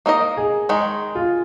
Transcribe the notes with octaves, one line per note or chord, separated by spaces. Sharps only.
A#3 D#4 A#4 D#5
G#4
D#3 G#3 D#4
F4